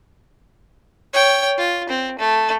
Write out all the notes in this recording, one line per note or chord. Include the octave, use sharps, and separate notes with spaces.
C#5 G5
F4
C4
A3